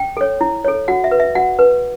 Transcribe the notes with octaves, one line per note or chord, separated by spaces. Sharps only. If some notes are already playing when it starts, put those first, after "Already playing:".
Already playing: G5
A4 C#5
E4
A4 C#5
F#4 F#5
E5
B4
E5
F#4 F#5
B4